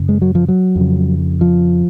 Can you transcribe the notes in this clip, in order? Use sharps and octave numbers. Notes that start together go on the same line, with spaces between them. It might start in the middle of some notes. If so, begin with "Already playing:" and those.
Already playing: F#2 C#3
G#3
F#3
F3
F#3
F2 C#3
F3